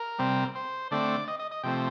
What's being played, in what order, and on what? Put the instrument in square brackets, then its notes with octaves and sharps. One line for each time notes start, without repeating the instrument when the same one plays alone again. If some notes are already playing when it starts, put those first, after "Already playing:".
Already playing: [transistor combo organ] A#4
C3 G3 C4
C5
D3 A3 C4 D5
D#5
D#5
D#5
C3 F3 A3 C4 G5